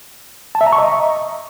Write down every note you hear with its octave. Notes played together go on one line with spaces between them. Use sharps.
A5
E5
A#5
C#6
D#5